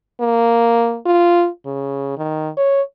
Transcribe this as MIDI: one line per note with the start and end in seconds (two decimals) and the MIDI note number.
0.20 0.98 58
1.06 1.48 65
1.66 2.15 49
2.17 2.50 51
2.57 2.82 73